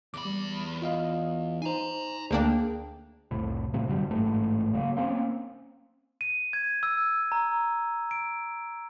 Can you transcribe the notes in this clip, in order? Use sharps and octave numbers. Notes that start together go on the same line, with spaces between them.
E2 B5 D6
G3
F4 D#5 F5
D#4 C5 G#5 A#5
D2 A#3 D4 G#4 G5
F1 C2 A2
A2 C3 F3
F#2 D3 F#3 G3
A1 G#2 A3
C#3 F#3 A#3
A#3 C4 C#4
D#7
G#6
E6
A#5
D7